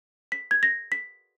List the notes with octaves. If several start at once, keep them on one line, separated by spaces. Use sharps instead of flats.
B6
G#6
A#6
B6